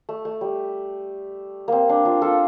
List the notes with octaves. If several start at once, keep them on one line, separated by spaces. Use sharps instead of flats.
A3
A3
G3
A#3 C4
D4
D4 F4
F4 A4